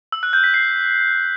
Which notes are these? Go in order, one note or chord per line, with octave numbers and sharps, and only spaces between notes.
E6
F#6
G6
B6
C7